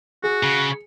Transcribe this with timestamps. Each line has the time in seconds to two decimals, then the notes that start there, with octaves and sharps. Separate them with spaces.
0.24 F#4 G#4
0.43 C#3